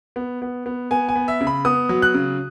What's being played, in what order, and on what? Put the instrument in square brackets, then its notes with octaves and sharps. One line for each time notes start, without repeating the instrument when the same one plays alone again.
[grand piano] B3
B3
B3
B3 G#5
G#5
B3
E5
C#3
B5
B3 D#6
F#3
F#6
C#3